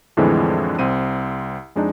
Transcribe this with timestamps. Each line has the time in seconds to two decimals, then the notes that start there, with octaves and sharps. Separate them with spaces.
0.17 F2 A2 D3 E3 G#3 C4
0.79 C2 C4 D#7
1.76 F2 G#3 D4 D#4